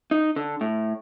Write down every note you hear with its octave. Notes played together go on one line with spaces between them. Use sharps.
D#4
D3
A2